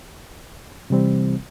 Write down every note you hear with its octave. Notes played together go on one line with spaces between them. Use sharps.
C3 E3 G3 C4